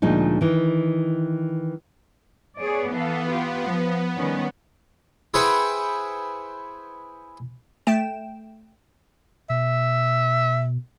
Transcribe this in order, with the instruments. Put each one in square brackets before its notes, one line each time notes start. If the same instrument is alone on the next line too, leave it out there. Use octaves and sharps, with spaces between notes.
[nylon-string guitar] D2 A#2 F3 G#3 D#4
D#3 E3
[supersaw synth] B3 [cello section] G#4 C#5 D5
[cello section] E3 A4 F5
F4 G4
F3
D#3 G3 C#4
[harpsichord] E4 G#4 B4 C5 F#5 G5
[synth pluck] A3 G5 E7
[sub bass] B2 [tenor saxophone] E5